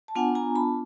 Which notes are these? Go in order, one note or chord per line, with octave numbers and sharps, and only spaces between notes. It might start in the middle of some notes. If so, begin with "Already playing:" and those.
A5
B3 D4 F4 F#5 G#5
G#5 A#5
A5 B5